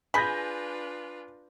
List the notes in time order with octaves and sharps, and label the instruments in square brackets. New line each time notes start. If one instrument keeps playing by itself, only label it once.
[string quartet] D4 F4 B4 [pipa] G#4 B5 [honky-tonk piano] G#5 G6 A#6